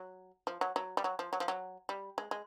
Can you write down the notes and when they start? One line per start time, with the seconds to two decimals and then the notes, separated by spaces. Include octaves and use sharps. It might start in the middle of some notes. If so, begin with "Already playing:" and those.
Already playing: F#3
0.47 F3
0.61 F#3
0.76 F#3
0.97 G3
1.04 F#3
1.19 F3
1.33 F#3
1.40 F3
1.48 F#3
1.89 G3
2.18 G#3
2.31 G#3